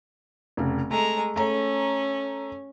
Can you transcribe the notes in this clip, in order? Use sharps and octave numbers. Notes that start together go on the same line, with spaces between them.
F1 C#3
G#3 A3 A#5
A3 C#4 A#5